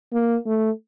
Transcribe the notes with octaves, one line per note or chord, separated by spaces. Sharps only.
A#3
A3